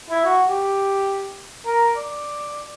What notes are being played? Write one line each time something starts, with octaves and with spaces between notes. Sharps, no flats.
E4
F#4
G4
A#4
D5